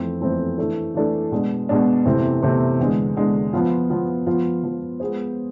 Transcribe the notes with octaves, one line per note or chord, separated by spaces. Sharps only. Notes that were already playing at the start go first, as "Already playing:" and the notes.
Already playing: F2 E3 A3 C4 E4
F2 E3 A3 C4 E4
E3 A3 D4 A4
E3 A3 D4 A4
B2 G#3 D4
B2 G#3 D4
E2 C3 E3 A3 C4
E2 C3 E3 A3 C4
E2 D3 G#3
E2 D3 G#3
F3 B3 F4
F3 B3 F4
F3 B3 F4
F3 B3 F4
G#3 B3 F4 G#4 C5